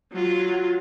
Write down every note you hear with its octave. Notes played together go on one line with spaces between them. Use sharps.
F#3 F4